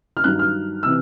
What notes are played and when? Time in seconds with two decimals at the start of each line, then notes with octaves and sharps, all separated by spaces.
0.17 F6
0.24 G2 D#3 F#3 F#6
0.39 F6
0.83 C3 E3 E6